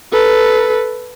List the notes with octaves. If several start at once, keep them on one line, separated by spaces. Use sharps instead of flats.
A4 B4